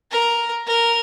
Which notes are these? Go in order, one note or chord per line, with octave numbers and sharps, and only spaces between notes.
A#4
A#4